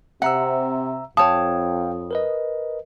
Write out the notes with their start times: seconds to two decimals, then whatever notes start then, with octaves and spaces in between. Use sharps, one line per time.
0.22 C3 E5 F#5 A#5 E6
1.17 F2 C#5 F5 G5 A5 D#6
2.11 A#4 B4 D#5